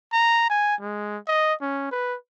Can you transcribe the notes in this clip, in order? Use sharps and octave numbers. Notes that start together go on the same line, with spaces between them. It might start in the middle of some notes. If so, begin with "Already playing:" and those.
A#5
G#5
G#3
D#5
C#4
B4